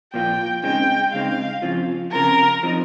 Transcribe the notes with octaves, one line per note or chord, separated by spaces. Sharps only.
A#2 F3 A#3 F4 G5
C#2 C#3 G#3 C4 D#4 G5
C#2 C#3 G#3 C4 D#4 F5
F2 C#3 F3 C4 F4
F2 C#3 F3 C4 F4 A#4
F3 C4 D#4